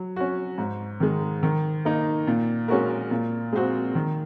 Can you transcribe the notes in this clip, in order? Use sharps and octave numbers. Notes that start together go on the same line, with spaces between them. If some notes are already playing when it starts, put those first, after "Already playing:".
Already playing: F#3
C#4 F#4
G#2
D#3 G#3
D#3
A#3 D#4
A#2
G#3 C#4 F#4 A#4
A#2
G#3 C4 F#4
D#3